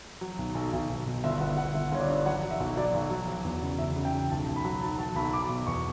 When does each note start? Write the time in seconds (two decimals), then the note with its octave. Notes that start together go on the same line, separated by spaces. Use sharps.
0.21 F#3
0.38 B1
0.55 B1
0.73 B1
0.89 B1
1.07 B2
1.24 G1 E5
1.40 G1 F#5
1.58 G1 F#5
1.74 G1 E5
1.92 G1 C#5
2.00 D5
2.08 G2
2.26 F#3 F#5
2.43 F#3
2.51 E5
2.60 B1
2.77 F#3 D5
2.94 B1
3.10 F#3
3.28 F#3
3.45 E2
3.62 C#3
3.79 E2 E5
3.96 C#3
4.05 G5
4.14 C#3
4.30 B1 A5
4.48 B1
4.56 B5
4.65 F#3
4.81 B1 A5
4.98 F#3 A5
5.16 B1 B5
5.33 F#3 D6
5.49 B2 D6
5.67 E2 C#6